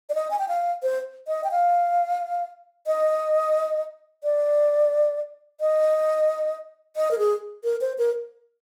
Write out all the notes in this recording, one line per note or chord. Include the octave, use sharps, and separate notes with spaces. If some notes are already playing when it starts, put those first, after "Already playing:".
D5
D#5
G#5
G5
F5
C5
D#5
G5
F5
D#5
D5
D#5
D#5
A#4
G#4
A#4
C5
A#4